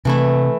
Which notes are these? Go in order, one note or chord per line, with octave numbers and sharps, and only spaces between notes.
C3 E3 A3 E4